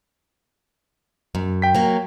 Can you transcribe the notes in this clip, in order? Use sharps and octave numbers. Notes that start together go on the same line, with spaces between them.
F#2
G5 B6
F#3 A#3